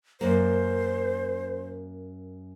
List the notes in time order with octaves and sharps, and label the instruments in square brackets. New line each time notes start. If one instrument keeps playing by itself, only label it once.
[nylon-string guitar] F#2 A#3 [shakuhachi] C5